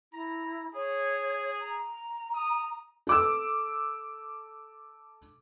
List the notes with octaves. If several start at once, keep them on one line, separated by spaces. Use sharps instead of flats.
E4 A#5
G#4 C#5
A#5
D#6
A4 D6 E6